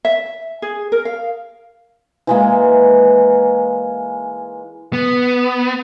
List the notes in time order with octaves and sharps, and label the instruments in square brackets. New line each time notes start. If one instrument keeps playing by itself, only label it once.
[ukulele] E5
G#4
A#4
F5
[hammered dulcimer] E3 G#3 A#3
[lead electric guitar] B3